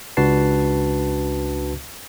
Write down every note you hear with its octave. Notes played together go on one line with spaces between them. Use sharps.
C#2 D4 F#4 B4 A5 C7